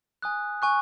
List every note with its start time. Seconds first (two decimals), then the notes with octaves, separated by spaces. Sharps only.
0.22 G#5 D#6 F#6
0.62 G#5 C#6 F#6